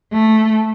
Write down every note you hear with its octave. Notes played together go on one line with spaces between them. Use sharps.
A3